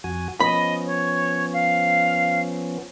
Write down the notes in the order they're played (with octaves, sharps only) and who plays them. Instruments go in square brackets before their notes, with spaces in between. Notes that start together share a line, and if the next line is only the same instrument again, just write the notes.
[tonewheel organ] F2 F#4 G#5
[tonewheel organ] F3 B3 C#4 [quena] D#5 [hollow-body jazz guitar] B5
[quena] C#5
F5